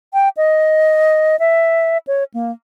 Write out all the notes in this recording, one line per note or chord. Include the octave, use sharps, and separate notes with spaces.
G5
D#5
E5
C#5
A#3